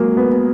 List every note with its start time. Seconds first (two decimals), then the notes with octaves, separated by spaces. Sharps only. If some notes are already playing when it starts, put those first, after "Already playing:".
Already playing: F#3 G#3 A#3
0.17 B3